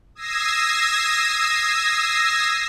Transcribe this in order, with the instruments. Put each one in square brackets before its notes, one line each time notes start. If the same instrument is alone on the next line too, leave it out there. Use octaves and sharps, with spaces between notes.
[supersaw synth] D#6 E6 G#6 A#6 C7